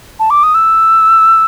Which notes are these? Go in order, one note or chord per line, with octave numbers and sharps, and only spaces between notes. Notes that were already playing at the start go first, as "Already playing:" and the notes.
A5
D6
D#6
E6